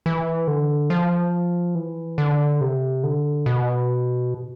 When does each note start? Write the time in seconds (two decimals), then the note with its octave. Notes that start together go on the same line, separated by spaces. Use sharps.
0.06 E3
0.48 D3
0.90 F3
1.75 E3
2.18 D3
2.61 C3
3.03 D3
3.46 B2